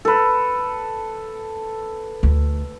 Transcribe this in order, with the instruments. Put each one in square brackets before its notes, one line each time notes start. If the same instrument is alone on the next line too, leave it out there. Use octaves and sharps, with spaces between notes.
[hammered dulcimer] A4 B4
[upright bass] D2